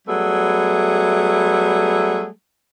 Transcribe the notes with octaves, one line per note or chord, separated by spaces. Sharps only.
F#3 G3 A3 B3 G#4